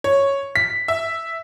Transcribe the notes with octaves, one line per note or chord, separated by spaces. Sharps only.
C#5
B6
E5